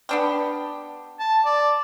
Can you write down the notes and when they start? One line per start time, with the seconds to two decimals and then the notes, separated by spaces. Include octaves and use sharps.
0.09 B3 D4 G4
1.19 A5
1.45 D5